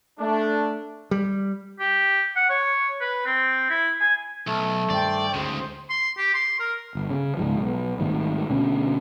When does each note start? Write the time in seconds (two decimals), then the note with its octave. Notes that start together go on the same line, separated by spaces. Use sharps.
0.19 A3 D4
1.11 G3
1.80 G4
2.36 F#5
2.50 C#5
3.01 B4
3.26 C4
3.70 E4
4.01 G#5
4.47 B1 A3
4.90 G2 D#3 G3 C5 D5 G5
5.34 D2 G#2 C#3 C5
5.90 C6
6.18 G4
6.34 C6
6.60 A#4
6.95 G1
7.10 C#3
7.37 C#2 G#2 F3
7.59 B1
7.99 G#1 A2 D#3 G3
8.49 D2 B2 C#4